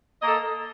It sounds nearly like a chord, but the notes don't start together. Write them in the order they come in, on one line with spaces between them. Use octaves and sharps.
D#5 A#3 A4